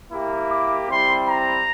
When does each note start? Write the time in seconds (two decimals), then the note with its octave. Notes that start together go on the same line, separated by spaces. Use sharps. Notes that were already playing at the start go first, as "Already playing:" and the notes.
0.12 A#3 E4 G4
0.51 D6
0.88 G3 C4 E4 C6
1.27 A#5